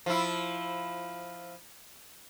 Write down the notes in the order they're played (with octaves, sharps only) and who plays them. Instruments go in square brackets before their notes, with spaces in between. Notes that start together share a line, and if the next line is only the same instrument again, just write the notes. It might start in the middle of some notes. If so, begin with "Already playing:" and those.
[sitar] F3 E4